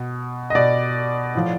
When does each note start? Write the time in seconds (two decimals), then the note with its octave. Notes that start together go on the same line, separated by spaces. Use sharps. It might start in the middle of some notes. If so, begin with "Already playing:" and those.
Already playing: B2
0.50 D#5
0.55 B2 D5
1.35 A2 F3